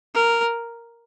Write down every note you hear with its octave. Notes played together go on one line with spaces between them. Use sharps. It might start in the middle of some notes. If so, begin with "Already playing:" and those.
A#4